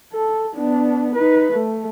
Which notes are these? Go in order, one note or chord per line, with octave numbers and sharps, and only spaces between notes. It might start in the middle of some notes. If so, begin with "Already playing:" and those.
A4
B3 D4
D#4 B4
A3